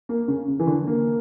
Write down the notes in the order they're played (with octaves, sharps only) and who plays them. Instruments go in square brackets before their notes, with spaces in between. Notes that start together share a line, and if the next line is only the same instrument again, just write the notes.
[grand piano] A#3
C#3
C#3
E3
D3
A#3